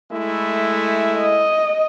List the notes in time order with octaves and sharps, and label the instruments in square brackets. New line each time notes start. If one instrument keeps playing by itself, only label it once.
[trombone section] G#3 A3 E4
[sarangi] D#5